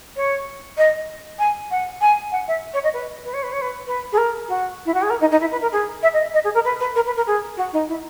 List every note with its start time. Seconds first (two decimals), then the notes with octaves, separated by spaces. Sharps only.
0.16 C#5
0.78 D#5
1.39 G#5
1.71 F#5
2.01 G#5
2.32 F#5
2.48 E5
2.74 C#5
2.84 D#5
2.94 B4
3.25 B4
3.34 C#5
3.43 B4
3.52 C#5
3.61 B4
3.87 B4
4.12 G#4
4.18 A#4
4.48 F#4
4.86 E4
4.94 F#4
5.02 G#4
5.10 A#4
5.20 D#4
5.31 D#4
5.41 E4
5.51 B4
5.62 A#4
5.72 G#4
6.03 E5
6.13 D#5
6.34 D#5
6.44 G#4
6.54 A#4
6.65 B4
6.80 B4
6.95 A#4
7.06 B4
7.16 A#4
7.27 G#4
7.57 F#4
7.73 D#4
7.88 E4